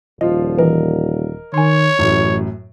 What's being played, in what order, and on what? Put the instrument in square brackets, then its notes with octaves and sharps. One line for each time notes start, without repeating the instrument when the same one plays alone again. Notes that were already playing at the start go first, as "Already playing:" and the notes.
[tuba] D#1 [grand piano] F3 F4 [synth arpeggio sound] D#5
[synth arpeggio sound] E3 [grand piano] A#4 D#5
[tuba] D#3 [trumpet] C#5 [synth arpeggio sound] G#5 C6
[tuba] A1 [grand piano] F#2 A2